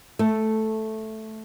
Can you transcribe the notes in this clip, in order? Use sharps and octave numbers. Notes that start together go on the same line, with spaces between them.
A3